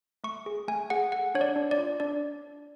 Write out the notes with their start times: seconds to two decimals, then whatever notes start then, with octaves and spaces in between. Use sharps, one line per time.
0.24 A3 C#6
0.46 G#4
0.68 A3 G#5
0.90 G#4 F#5
1.12 A4 F#5
1.35 D4 C#5
1.41 D5
1.56 D4
1.71 D5
1.78 F4
2.00 D4 D5